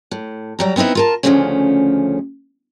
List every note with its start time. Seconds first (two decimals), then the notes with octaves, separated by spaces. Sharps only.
0.11 A2
0.59 F#3 G3 A#5
0.76 B3 C4 D#4 E4 B4
0.95 F4 A#4 A5
1.23 D2 A#2 C#3 F3 A3 C#4